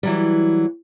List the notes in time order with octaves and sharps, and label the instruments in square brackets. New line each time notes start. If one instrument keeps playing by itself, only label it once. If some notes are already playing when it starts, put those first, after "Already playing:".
[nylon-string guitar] E3 F#3 G3